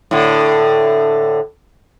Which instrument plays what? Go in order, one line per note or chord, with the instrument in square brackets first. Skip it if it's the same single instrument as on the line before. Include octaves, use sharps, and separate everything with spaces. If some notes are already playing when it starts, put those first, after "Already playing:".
[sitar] A2 D3